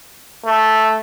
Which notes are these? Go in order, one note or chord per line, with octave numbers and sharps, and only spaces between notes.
A3